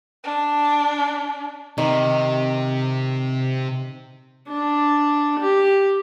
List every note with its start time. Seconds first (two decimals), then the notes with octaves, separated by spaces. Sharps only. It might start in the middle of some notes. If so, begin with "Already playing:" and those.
0.24 D4
1.78 C3 D#3
4.48 D4
5.40 G4